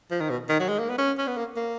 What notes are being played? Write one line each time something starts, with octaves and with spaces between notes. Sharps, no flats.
F3
D#3
B2
D#3
F#3
G#3
A#3
B3
C#4
C#4
B3
A#3
A#3